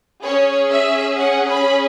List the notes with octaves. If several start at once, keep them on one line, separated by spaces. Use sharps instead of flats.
C#4 G#4 C#5
E5
F#5
B5